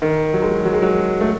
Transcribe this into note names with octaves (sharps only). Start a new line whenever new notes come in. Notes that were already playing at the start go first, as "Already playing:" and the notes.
D#3
F#3
G#3
F#3
F#3
G#3
F#3
A3